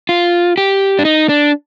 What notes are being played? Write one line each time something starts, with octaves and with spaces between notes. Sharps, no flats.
F4
G4
D4
D#4
D4